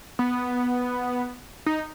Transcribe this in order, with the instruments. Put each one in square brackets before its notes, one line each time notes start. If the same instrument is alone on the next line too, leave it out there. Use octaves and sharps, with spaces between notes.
[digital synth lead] B3
D#4